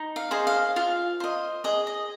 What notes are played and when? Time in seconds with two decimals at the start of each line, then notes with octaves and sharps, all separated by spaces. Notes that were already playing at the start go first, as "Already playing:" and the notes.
Already playing: D#4
0.16 F5
0.31 G#4 C5 D#5
0.47 F5
0.76 F4 F5
1.20 C5 D#5
1.64 G#4 D#5
1.87 D#5